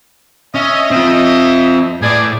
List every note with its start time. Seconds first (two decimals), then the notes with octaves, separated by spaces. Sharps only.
0.55 C#4 D#5 E5
0.91 C4 F4
2.02 A2 E3 G#4 D5